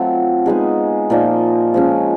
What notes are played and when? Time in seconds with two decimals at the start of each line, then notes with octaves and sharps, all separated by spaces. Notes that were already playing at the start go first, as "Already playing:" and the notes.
Already playing: F#3 A3 C4 F4
0.46 G#3 B3 D#4 G#4
1.10 A#2 F3 A#3 D#4
1.74 F3 G#3 C#4